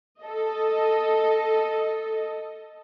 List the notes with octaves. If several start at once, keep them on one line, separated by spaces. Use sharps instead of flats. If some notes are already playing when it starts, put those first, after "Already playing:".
A4 D#5